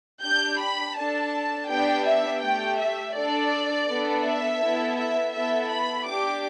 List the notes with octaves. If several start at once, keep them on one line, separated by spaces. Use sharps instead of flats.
D4 G4 G6
B5
D4 A4 A5
B3 D4 G4 G5
E5
A3 G4 G5
E5
D4 A4 D5
B3 D4 A4
E5
B3 E4 A4
E5
B3 E4 A4 E5
B5
D4 G4 D6